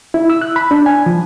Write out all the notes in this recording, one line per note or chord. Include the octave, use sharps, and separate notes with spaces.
E4
E6
F#6
B5
D4
G#5
F3